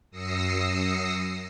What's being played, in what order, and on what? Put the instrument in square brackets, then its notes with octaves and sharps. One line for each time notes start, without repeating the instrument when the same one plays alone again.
[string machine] F#2 D#6 E6 A#6 C7 C#7